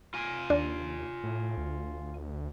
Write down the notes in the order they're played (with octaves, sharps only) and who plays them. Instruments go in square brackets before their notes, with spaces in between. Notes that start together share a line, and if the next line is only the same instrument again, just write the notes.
[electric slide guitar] F4 G#5
[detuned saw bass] D#2 [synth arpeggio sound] D4
[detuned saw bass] A2
D2